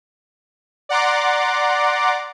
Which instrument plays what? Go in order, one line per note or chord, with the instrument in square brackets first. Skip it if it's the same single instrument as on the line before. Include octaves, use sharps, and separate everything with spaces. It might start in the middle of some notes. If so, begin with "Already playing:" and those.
[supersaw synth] D5 F#5 A#5 C6 D6